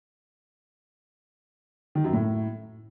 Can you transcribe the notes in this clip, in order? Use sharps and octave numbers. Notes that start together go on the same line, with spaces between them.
D#3
F#2
A2